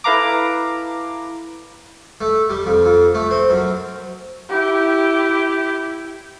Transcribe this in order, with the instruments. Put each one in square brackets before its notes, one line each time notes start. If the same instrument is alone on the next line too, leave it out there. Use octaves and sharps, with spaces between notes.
[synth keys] E4 A4 B4 F5 A#5 D6
[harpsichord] A3
G3
F2
F2
A3
C4
F#2
[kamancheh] E4 G4